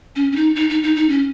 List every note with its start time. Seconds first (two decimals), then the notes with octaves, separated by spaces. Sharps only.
0.16 C#4
0.32 C#4
0.36 D#4
0.56 D#4
0.70 D#4
0.83 D#4
0.96 D#4
1.09 C#4